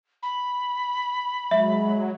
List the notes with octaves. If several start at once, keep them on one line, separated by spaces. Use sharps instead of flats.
B5
F#3 G#3 E5